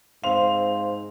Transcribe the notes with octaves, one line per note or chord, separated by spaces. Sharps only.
G#2 C4 F5 C6 F7